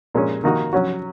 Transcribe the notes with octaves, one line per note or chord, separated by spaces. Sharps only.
A#2 G#3 C#4
D#3 A#3 D#4 F#4
F#3 C#4 F#4